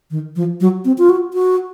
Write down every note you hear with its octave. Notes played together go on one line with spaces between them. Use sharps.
D#3
F3
F#3
C4
F4
F#4
F#4